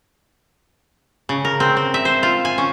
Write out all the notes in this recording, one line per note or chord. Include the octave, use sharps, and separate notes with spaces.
C#3
A#4
C4
C4
E5
C5
F4
G#5
C#4